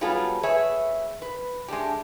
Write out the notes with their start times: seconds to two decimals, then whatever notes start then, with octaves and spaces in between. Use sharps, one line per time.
0.01 F#3 G3 B3 F4 G#4 A4
0.43 G#4 B4 C#5 E5
1.22 B4
1.68 G#3 A3 D4 G4